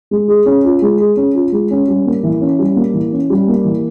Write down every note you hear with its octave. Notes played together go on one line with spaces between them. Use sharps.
G#3
G#4
C#4
F4
G#3
G#4
C#4
F4
G#3
C#4
G3
A#3
E3
C#4
G3
A#3
E3
C#4
G3
A#3
E3